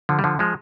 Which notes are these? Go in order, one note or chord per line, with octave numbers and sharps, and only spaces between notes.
D3 F3
G3
D3 F3
F3 G#3